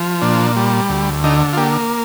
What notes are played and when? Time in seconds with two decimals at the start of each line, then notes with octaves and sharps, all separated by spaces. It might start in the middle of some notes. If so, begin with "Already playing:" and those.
Already playing: F3
0.21 A#2 D4
0.56 G3
0.89 D2
1.24 D3 D#4
1.53 F4
1.57 A#3 G4